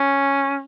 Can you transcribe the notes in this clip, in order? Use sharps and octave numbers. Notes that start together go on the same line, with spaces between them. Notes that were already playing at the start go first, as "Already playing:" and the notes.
Already playing: C#4